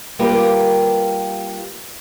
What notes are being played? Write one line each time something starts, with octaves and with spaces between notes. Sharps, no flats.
G3 A#3 F4 G4 A#4 B4